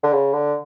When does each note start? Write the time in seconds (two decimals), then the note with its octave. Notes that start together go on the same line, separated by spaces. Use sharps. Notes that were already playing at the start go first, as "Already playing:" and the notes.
0.03 D3
0.13 C#3
0.33 D3